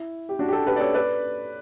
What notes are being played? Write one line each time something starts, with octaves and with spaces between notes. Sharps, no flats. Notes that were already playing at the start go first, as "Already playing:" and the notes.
Already playing: E4
G4
D4 F#4
G4
F#4 A4
G4 B4
D5
A4 C#5
B4 D5